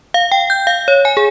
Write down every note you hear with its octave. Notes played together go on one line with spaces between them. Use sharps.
F5
G5
G6
F5
C#5
G#5
G#4